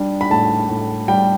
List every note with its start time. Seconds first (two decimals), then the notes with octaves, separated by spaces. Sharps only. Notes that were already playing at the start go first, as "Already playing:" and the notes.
Already playing: G3 D4
0.21 B5
0.30 A2 A5
0.69 A2
1.08 G3 G5